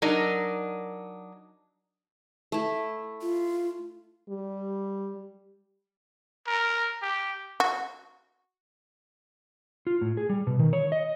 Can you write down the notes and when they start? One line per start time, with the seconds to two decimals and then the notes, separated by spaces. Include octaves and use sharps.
0.02 F#3 D4 D#4 A#4
2.52 A3 E4
3.22 F4
4.29 G3
6.47 A#4
7.02 G4
7.60 F#4
9.87 F4
10.01 A2
10.17 G#4
10.30 G3
10.47 B2
10.59 D#3
10.73 C#5
10.92 D#5